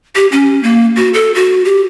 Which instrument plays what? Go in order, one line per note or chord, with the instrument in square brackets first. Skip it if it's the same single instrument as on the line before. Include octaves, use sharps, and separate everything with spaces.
[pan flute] G4
C#4
A#3
F#4
A4
F#4
G4